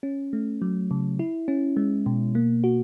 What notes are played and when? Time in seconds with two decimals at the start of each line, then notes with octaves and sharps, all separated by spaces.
0.03 C#4
0.33 A3
0.62 F#3
0.91 C#3
1.19 E4
1.48 C#4
1.77 G#3
2.06 B2
2.35 A#3
2.64 F#4